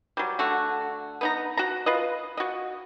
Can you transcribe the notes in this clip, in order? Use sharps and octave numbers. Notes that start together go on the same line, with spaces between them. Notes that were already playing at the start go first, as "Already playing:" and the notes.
F#3 G3
D3 A3 F#4
B3 D#4 A#5
F#4 A#5
F4 B4 D#5
F#4 D#5